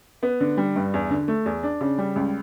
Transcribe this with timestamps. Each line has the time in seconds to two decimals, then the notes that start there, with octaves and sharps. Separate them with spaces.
0.23 B3
0.40 D3
0.57 G3
0.76 G2
0.94 E2
1.10 D3
1.28 A3
1.46 E2
1.63 D4
1.81 C#3
1.98 G3
2.16 C#2